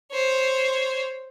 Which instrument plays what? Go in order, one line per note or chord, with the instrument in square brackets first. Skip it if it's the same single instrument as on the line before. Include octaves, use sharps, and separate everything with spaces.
[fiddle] C5 C#5